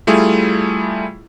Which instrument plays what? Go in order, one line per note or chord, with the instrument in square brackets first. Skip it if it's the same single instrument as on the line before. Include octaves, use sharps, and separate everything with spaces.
[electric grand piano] G3 A3 E4 F4 G#4